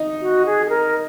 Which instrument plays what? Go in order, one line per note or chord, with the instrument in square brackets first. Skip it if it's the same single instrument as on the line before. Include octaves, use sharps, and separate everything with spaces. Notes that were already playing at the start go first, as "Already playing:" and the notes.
Already playing: [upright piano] D#4
[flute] F#4
G#4
G#4
A#4